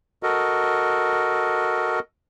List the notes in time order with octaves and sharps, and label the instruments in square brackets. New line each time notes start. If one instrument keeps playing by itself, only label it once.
[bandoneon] F#4 A4 A#4 D#5